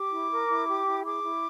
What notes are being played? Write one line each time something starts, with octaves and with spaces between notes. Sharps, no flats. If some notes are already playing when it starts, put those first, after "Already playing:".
Already playing: G4 D6
E4
A#4
E4
G4
E4
G#4 D6
E4